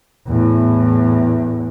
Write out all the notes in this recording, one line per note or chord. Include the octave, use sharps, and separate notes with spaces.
E2 A2